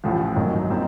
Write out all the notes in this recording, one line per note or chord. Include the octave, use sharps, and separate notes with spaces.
A1 A2 F3
G#1 F#2 D#3 F#3
A#2 G3 C4 D#4